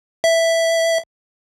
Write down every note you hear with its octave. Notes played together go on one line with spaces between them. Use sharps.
E5